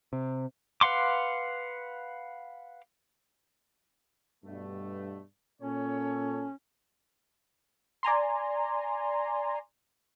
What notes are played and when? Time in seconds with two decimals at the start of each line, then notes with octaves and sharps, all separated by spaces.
0.13 C3
0.81 B4 F5 F#5 C6 D6
4.44 G2 B2 A3
5.62 A#2 C#4 A4 C#5
8.03 D5 G#5 A#5 C6